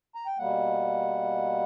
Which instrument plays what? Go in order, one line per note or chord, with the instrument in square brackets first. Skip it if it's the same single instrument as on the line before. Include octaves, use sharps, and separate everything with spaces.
[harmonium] A#5
G5
B2 G3 A#3 F#5